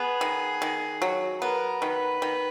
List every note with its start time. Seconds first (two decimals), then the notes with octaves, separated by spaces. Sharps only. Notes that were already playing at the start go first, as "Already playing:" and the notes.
Already playing: B3 G#4
0.21 D#3
0.62 D#3
1.02 F#3
1.41 B3 A#4
1.82 D#3 B4
2.22 D#3